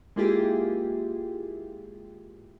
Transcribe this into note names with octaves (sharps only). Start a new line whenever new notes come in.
G#3 A#3 E4 F4 G4 G#4